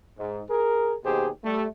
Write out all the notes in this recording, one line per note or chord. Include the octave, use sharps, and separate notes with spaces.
G#2
G#4 A#4
D#2 B2 G4 G#4 C5
G3 A3